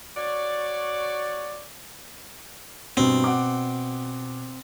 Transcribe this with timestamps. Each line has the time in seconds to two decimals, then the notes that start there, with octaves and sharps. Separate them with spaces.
0.17 F#4 C#5 D5
2.97 G2 B2 C4
3.24 B2 F#5 D6